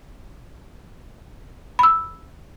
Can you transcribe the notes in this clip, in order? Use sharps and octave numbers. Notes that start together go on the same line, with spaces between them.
B5 E6